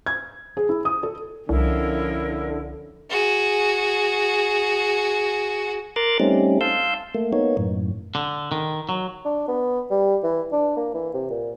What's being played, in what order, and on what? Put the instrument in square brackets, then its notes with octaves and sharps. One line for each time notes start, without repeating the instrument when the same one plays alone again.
[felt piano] G#6
G#4
E4
D#6
A4
[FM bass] C2 [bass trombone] D3 [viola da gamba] F3 C#4 [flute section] E4 A#4
[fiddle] F#4 G#4
[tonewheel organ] A#4 A#5 C6 D6 F#6 A6
G3 A3 C4 C#4 D#4
F5 A5 C6 E6 G6
A3 A#3
A#3 B3 D#4 C#5
F#2 A2
[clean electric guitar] D3
D#3
F#3
[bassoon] D4
B3
G3
E3
D4
A#3
E3
C3
A#2